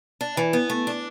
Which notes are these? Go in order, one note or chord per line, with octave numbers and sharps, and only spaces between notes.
D4
E3
B3
A3
D4